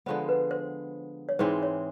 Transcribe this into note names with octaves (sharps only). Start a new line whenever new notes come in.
D3 F3 G#3 B3 C5
B4
C5
C#5
G#2 E3 G#3 C4 C5
C#5